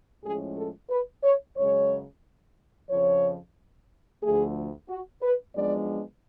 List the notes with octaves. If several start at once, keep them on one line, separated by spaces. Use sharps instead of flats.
A2 F3 G#3 C#4 G#4
A4
B4
C#5
F#2 C#3 G#3 C#5
F2 C#3 F3 C#5
D2 D3 F3 A3 G#4
F#4
B4
F#2 F3 G#3 B3 D4 D5